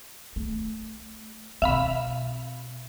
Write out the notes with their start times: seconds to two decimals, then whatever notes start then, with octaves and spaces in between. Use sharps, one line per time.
0.36 A3
1.62 B2 C4 E5 F5 B5